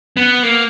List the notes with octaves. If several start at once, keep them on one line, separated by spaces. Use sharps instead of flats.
B3
A#3